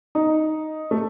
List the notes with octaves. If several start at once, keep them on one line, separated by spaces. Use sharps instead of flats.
D#4
A3